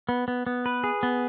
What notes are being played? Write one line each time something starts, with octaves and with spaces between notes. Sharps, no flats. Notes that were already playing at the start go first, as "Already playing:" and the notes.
B3
B3
B3
B4
G#4
B3